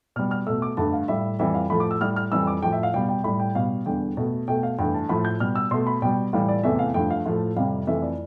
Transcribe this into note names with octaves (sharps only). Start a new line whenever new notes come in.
B2 G3 F6
F6
B2 A3 E6
D6
G2 D3 A3 A5
F5
A2 G3 E5
F2 E3 G3 E5
F5
A2 F3 A3 B5
D6
E6
A2 G3 F6
F6
F2 E3 G3 E6
D6
A2 F3 A3 G5
E5
F5
B2 G3 G5
G5
A2 G3 B5
G5
B2 G3 F5
E2 D3 G3 G5
B2 A3
B2 A3 G5
F5
G2 E3 A3 G5
A5
A2 F3 A3 B5
G6
B2 G3 F6
E6
B2 A3 C6
B5
B2 G3 G5
A2 E3 G3 F5
D5
E2 C3 E3 A3 E5
F5
G2 F3 A3 G5
F5
A2 F3 A3
F2 C3 G3 F5
F2 E3 A3 E5
D5